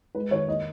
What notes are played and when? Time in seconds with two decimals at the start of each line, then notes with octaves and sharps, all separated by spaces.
0.15 G#3 B4
0.31 D#3 C#5
0.48 A#3 D#5